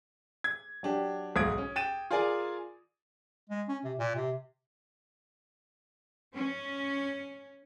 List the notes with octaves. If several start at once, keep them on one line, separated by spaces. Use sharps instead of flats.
G#6
F#3 D4 G4
D1 B1 G#2 D#6 G#6 D7
C#4
G5 A6 D#7 E7
F4 G#4 A#4 D5 G#5
G#3
C#4
C3
A#2
C3
C#4